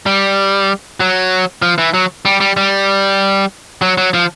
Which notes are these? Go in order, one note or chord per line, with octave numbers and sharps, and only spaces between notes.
G3
F#3
F3
E3
F#3
G3
G3
G3
F#3
F#3
F3